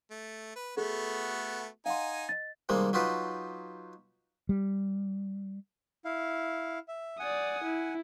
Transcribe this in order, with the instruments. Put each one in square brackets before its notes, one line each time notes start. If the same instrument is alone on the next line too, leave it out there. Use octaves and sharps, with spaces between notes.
[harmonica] A3
B4
[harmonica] A3 B3 F#4 [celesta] G#4 A4
[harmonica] D#4 G#5 [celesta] F5 F#5 C6
[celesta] D#5 A6
[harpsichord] C3 D#3 G3 G#3 A#3
F#3 D#4 F4 G4 B4
[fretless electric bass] G3
[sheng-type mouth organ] E4 F5
E5
[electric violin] D5 D#6 [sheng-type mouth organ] F#5 G#5
[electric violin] E4